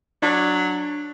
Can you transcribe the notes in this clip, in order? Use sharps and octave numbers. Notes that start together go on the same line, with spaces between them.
F#3 D4